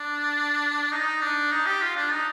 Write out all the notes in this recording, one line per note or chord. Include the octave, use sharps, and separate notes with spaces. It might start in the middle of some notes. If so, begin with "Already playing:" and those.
Already playing: D4
D#4
D4
D#4
G4
F4
D4
D#4